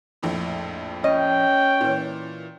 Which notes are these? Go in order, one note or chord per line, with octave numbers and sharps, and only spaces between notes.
A#1 F2 A2
C#4 D#5 G5
A#2 E3